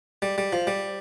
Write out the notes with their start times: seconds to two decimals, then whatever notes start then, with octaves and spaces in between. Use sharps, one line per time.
0.22 G3
0.38 G3
0.52 F3
0.67 G3